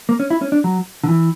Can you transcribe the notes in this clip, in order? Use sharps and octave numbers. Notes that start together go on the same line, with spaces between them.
A#3
C#4
E4
C#4
D4
F#3
D3
E3